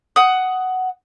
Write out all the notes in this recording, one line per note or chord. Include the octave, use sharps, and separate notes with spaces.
F#5 D#6